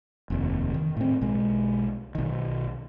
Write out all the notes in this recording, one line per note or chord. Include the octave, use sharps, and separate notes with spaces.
F1 D#2
D#3
A2 C4
B1 G#3
B1 D#3